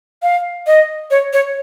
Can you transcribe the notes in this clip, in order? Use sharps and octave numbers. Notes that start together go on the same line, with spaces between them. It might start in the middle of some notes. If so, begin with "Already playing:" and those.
F5
D#5
C#5
C#5